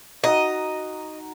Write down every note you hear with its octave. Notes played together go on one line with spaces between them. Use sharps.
D#4 F#4 D#5 A#5